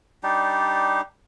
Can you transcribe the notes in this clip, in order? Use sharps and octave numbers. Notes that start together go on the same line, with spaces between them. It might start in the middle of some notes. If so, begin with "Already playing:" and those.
G3 D4 D#4 G4